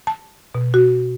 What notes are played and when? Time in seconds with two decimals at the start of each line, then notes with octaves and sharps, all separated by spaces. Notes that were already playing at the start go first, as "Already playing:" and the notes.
0.07 A5
0.55 B2
0.74 F#4